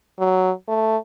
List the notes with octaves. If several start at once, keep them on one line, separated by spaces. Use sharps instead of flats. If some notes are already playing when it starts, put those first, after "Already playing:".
F#3
A3